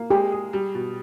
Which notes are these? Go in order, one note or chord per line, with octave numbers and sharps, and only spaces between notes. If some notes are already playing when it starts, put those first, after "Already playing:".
Already playing: A#3
G#3 G4
G#4
G3
B2